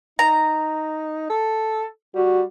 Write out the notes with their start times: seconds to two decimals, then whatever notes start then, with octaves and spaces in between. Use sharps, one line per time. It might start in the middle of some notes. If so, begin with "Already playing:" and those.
0.19 D#4 A#5
1.30 A4
2.15 G3 F#4